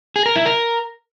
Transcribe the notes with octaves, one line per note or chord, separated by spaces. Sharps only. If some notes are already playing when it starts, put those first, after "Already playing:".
G#4
A#4
E4
A#4